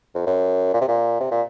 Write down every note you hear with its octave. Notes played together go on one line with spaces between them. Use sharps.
F2
F#2
A#2
C3
A#2
C3
A#2